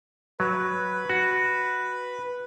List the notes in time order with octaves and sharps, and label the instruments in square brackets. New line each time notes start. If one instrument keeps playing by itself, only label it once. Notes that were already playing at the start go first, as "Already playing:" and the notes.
[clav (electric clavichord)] F#3 [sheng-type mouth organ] B4
[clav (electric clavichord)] F#4